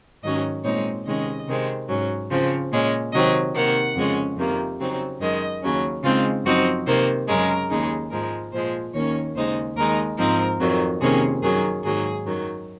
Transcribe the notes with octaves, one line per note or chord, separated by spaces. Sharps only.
G#2 D#3 F#3 C#4 D#5
A#2 G#3 C4 D#4 C#5
C3 D#3 G#3 C#4 D#5
C3 D#3 G#3 C4
G#2 F#3 C#4
C#3 F3 C4
A#2 G#3 C#4
C3 D#3 F#3 C4 D#5
C3 D#3 A#3 F#5
F2 C#3 G#3 C#4
F2 C3 D#3 A#3
C#3 F#3 C4 D#4
F#2 D#3 G#3 D#5
D#2 C#3 F#3 C#4
C#3 G#3 C4 D#4 F4
F#2 F3 C4 D#4 F#4
C3 D#3 A#3 C5
F#2 C#3 G#3 A#4
D#2 C#3 G#3 D#4
G#2 F3 G#3 A#4
A#2 F3 G#3 C5
D#2 D#3 A#3 C#4 C#5
D#2 C#3 G#3 D#4 C5
D#2 D#3 G#3 D#4 A#4
G#2 F3 C4 D#4 A#4
F2 D#3 F#3
F2 C3 D#3 A#3 C#4 G#4
F#2 D#3 F#3 G#4
G#2 D#3 F#3 A#3 G#4
F#2 D#3 F#3